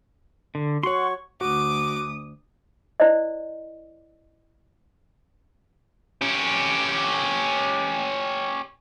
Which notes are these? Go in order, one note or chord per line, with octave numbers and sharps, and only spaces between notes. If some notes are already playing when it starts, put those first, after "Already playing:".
D3
F#4 C#5 F#5 C6 C#6
D2 F#4 D6 D#6
E4 C5 D5 D#5
C#4 G4